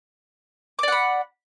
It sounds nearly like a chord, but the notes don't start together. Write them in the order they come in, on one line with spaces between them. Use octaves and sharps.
D6 D5 F#5 B5